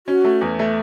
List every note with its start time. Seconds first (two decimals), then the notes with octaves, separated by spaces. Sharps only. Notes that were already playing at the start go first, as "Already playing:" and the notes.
0.07 C#4 F#4
0.24 A3
0.41 E2
0.59 A3